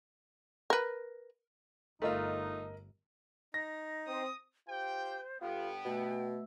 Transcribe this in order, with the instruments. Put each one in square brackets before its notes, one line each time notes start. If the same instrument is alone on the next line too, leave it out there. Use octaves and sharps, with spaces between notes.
[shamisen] A#4 B4
[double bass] G1 [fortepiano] A3 F4 [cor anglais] D#4 [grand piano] A#4 D#5
[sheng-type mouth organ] D#4 [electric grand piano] A#6
[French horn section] C4 [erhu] D#6
[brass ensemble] F4 G4 G5 [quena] C5
[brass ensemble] G2 B3 [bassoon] F4 [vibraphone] G4 A4 [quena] G5
[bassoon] B2 [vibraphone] A3 E5 E6